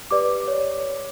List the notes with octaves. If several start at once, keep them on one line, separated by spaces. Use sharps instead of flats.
G4 B4 D5 D6
C#5